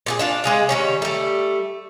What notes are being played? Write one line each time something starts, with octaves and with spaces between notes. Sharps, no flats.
A#2 F#4 G#4
D4 F4 D5
G#3 G#4 F5
D#3 G3 C#4
G3 A3